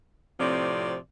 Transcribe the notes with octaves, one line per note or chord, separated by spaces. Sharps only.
A2 C3 F3 C4 D5